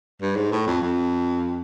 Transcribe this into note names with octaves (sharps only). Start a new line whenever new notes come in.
G2
G#2
A2
F2
F2